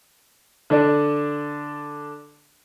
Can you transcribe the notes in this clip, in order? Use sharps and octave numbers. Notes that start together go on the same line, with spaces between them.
D3 D4